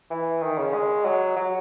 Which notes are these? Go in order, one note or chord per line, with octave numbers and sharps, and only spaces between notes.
E3
D#3
C#3
G#3
F#3
F#3